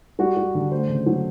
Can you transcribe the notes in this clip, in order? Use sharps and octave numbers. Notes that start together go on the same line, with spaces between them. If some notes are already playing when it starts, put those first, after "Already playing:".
G3 F#4
G3
D3
A3 C5
C#3
F#3